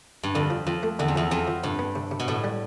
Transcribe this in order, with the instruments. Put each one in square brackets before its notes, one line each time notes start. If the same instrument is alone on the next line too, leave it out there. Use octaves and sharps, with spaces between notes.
[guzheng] G2
[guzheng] F2 [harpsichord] D3
[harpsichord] F3
[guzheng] F2 [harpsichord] F3
[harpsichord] A3
[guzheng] E2 [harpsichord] D3
[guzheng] F2
[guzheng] E2 [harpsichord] F3
[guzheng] F2 [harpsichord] F3
[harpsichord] F3
[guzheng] G2 [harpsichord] C3
[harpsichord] B3
C3
C3
[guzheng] B2
[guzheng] A2 [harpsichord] C3
[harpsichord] G3